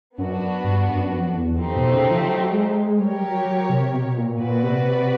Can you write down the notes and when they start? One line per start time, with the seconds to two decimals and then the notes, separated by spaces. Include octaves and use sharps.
0.18 F#2 B3 D4 F#4
0.64 G2
0.88 F#2
1.12 F2
1.35 E2
1.58 F2 A3 C4 D#4 G4 C5
1.76 B2
1.93 C#3
2.11 F3
2.28 F#3
2.52 G#3
2.75 G#3
2.99 G3 G4 A#4 C#5
3.22 F#3
3.45 F#3
3.69 C3
3.93 B2
4.17 A#2
4.40 A#2 F#4 B4 D5
4.63 C3
4.87 C3